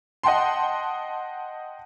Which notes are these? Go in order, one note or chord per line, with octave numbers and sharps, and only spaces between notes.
D#5 F#5 G5 A5 C6